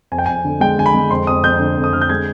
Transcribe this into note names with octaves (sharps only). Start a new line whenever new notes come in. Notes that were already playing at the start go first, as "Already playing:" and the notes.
F2 G#5
G5
F2 G#5
D3
G#3 G5
D3 G#5
B5
G#3
F2 C6
F2 D#6
F2 G6
D3
F2
D#6
D3 F6
G6
G#3 G#6